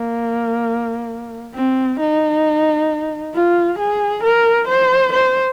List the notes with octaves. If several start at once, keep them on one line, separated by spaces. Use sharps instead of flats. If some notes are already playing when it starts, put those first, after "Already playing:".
Already playing: A#3
C4
D#4
F4
G#4
A#4
C5
C5